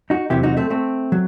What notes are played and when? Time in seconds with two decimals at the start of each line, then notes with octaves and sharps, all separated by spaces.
0.10 D#4 F#4
0.30 E2 C3 F#3 E4 G4
0.43 D#4 F#4
0.57 A3 C4
0.70 A3 C4
1.12 F#3